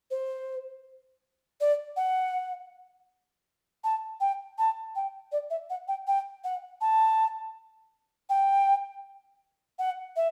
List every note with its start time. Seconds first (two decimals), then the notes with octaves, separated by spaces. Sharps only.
0.10 C5
1.60 D5
1.96 F#5
3.84 A5
4.20 G5
4.58 A5
4.95 G5
5.32 D5
5.50 E5
5.70 F#5
5.88 G5
6.07 G5
6.44 F#5
6.81 A5
8.29 G5
9.79 F#5
10.16 E5